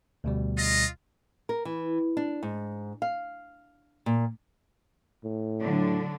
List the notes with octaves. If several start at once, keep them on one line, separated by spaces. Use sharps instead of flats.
D2 B2 G3
F4 D#5
A#4
E3
D4
G#2
F5
A#2
A2
D3 F#3 D4